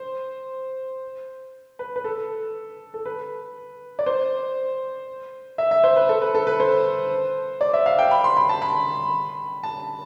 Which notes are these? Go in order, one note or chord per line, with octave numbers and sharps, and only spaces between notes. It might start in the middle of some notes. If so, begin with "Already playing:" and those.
Already playing: C5
B4
B4
A4
A4
B4
D5
C5
E5
E5
C5
B4
A4
B4
A4
B4
C5
D5
E5
F5
G5
B5
C6
B5
A5
B5
A5